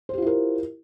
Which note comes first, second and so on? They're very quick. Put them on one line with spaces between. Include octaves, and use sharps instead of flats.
C5 G4 F4 E4 A#4